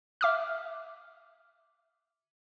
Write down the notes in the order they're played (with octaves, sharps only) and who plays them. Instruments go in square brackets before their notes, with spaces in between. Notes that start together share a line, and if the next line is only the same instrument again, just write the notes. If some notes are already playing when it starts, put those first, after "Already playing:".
[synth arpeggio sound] E5 D6 F6